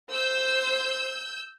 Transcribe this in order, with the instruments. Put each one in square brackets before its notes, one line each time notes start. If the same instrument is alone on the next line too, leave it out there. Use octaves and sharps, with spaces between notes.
[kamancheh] C5 [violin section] E6 G6